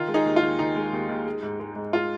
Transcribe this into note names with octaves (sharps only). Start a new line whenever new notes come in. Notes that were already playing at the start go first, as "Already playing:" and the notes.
Already playing: D#3 F4
G#3
D#4 G#4
D#2
F4
D#2
D#3 D#4
G#3
D#2
D#2
G#3
G#2
G#3
G#2
G#3 F4